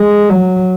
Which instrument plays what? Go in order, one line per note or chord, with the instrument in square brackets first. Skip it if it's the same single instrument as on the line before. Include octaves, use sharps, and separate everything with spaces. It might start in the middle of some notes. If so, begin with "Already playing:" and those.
Already playing: [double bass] G#3
F#3